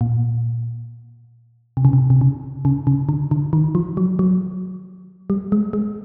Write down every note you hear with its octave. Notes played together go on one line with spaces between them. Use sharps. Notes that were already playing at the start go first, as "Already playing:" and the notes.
A#2
C3
C#3
C3
C3
C#3
C#3
C#3
D3
D3
D#3
F3
F#3
F#3
G3
G#3
G#3